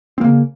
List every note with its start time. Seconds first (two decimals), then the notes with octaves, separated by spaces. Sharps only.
0.18 C4
0.21 A#3
0.24 C#3